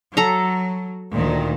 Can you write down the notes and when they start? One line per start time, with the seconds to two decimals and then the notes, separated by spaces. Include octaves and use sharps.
0.17 F#3 A4 A#5
1.15 D2 A#2 D#3